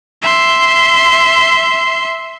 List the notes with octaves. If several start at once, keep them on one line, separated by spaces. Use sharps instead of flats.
E5 C6